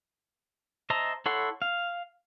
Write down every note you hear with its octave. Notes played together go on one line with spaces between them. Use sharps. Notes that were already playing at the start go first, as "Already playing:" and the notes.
C5 D#5 E5 A5 A#5
E4 A4 C#5 F#5 C6
F5